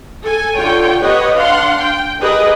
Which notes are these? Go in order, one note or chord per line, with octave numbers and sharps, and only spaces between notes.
A4 G#5
D3 F4 C#5 G5
G4 B4 C#5 D#5 F#5
D4 F5 F#5 C6
G5
G4 G#4 A#4 B4 D#5